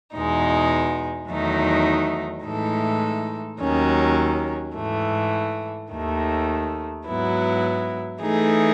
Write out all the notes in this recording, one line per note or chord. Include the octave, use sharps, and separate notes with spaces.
E2 B2 G#3 D#4
E2 D#3 F#3 A3 D#4
A2 E3 G#3 D#4 A4
D#2 D#3 F#3 C#4
G#2 E3 A3
D#2 D#3 A3
G#2 F#3 B3 E4
E3 A3 D#4 G#4